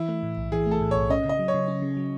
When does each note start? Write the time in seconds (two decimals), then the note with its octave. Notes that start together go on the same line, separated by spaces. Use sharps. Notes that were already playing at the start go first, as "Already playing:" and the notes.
Already playing: E3 E4
0.09 A3
0.23 A2
0.37 B1
0.52 E3 G#4
0.66 A3
0.71 A4
0.81 A2
0.91 B1 C#5
1.10 C#4 D#5
1.25 C#3 D#5
1.39 F#3
1.48 C#5
1.54 C#3
1.68 C#4
1.82 C#3
1.97 F#3